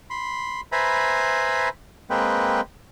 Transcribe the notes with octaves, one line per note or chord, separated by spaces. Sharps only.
B5 C6
B4 C5 E5 G#5 A#5 B5
G#3 A#3 C4 B4 G5